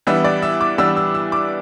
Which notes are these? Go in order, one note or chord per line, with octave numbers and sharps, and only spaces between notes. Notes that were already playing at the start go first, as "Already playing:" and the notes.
E3 G3 B3 D4 E5
D5
E5
D6
E3 G3 B3 D4 E6
E6
E6
D6